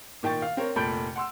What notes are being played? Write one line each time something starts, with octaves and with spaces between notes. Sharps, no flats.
A#2 D#3 G5 C#6 A6
F5
C4 A#4 C#5
F1 A#2 A4 B5 G6 D7
F#5 C6 E6